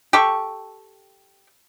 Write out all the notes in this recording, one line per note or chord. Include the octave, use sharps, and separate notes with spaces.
G4 A4 C#6